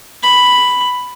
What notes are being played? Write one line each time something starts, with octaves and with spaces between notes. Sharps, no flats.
B5